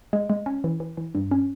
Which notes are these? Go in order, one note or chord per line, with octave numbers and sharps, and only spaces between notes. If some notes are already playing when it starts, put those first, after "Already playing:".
G#3
G#3
C#4
E3
E3
E3
G2
C#4